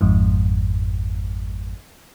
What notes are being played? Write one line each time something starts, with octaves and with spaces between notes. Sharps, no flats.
G#1 F2 G#2